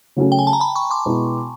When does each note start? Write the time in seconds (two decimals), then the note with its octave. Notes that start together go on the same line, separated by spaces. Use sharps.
0.16 C#3 F#3 A3 C#4
0.32 G5
0.39 G#5
0.47 A5
0.53 A#5
0.60 A5 B5
0.76 B5 C#6
0.91 C6 D6
1.06 B2 G#3 B3 E4